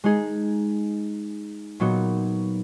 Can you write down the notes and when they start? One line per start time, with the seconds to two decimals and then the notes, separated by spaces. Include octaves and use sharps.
0.04 G#3 D#4 G#4
1.80 A#2 F#3 B3 D#4 F#4